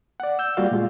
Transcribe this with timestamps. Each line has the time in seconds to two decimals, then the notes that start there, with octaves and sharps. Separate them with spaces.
0.20 D5 F#5
0.39 E6 G6
0.57 G3 A#3 F4 F#4 D5 F5
0.72 A#2 G#3 F4